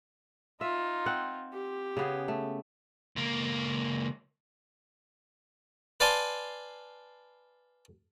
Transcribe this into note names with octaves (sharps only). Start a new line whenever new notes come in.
D#4 F4 E5
C4 F#5
G4
C#3 B3 G#4
A3
C#2 A#3
B4 D5 F5 G#5 A5 C6